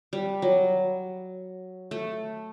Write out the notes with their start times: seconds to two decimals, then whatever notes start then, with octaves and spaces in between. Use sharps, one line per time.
0.13 G3
0.42 F#3
1.91 A3